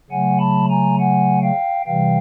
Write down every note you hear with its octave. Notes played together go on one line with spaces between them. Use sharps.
C#3 F#3 A3 F#5 G#5
A5 B5
G#5 A#5
F#5 G#5
F5 G5
C3 E3 G3 F5 G5